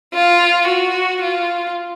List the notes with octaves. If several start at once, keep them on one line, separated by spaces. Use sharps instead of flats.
F4
F#4
F4